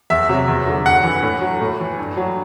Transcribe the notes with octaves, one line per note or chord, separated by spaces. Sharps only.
E2 E5
C3 F#3
E2
D3 F#3
G2 F#5
E3
A2
F#3
A2
E3
G2
F#3